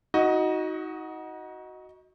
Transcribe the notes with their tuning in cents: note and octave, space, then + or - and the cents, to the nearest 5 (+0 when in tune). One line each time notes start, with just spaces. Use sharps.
D#4 +35 F#4 +0 D#5 +0